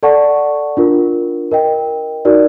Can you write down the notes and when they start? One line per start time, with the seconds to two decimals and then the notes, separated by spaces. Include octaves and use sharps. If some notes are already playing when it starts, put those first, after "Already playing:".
0.03 A4 D5 F#5 A5 C#6
0.77 D4 F4 A#4
1.51 A#4 D#5 G5
2.25 D#4 F#4 A#4 D5